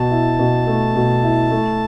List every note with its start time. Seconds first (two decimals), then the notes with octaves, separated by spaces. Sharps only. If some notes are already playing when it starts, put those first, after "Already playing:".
Already playing: B2 A5
0.11 E4
0.39 B2
0.67 A3
0.95 B2
1.23 E4
1.51 A3